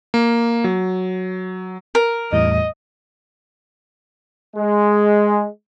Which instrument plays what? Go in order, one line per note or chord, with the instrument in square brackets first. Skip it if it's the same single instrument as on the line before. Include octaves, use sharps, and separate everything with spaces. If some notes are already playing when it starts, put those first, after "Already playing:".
[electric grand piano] A#3
F#3
[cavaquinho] A#4
[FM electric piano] E2 A2 G3 [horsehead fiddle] D#5
[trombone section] G#3